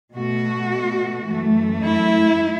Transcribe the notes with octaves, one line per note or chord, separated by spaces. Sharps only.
B2 A3 F#4
F#2 E3 A3
E4